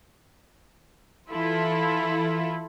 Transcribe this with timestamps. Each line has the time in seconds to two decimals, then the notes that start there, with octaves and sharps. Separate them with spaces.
1.30 E3 E4 F4 A4